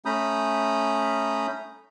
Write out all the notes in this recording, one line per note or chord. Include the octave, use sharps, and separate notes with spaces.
A3 C#4 A#5 B5 D#6 G6